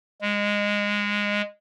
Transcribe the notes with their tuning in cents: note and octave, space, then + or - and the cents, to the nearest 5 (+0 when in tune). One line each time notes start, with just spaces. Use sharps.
G#3 -15